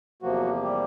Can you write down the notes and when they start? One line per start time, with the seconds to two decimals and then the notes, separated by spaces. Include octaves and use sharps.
0.22 E2 C3 F3 F#3 A#3 F#4
0.62 G3 G4